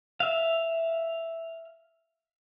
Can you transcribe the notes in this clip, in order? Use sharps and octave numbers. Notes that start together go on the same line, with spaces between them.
E5 F5